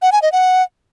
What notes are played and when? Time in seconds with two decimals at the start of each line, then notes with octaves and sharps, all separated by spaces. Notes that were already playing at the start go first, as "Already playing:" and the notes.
0.02 F#5
0.12 G#5
0.22 D#5
0.32 F#5